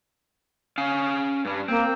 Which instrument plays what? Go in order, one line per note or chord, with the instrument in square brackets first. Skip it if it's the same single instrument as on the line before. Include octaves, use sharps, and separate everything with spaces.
[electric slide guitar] C#4 F5
G2 G3
[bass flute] A#3 [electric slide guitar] C4